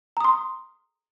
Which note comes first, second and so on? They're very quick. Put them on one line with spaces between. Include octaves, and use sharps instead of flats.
A#5 D#6 C6